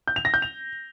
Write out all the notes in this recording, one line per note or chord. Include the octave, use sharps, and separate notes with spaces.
G6
F7
A#6
G6
F7